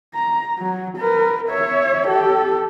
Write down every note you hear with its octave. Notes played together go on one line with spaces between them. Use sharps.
A#5
F#3
A#4 B4
C#5 E5
G4 A4